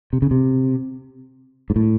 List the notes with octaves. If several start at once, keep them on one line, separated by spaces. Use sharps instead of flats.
C3
C#3
C3
G#2
A2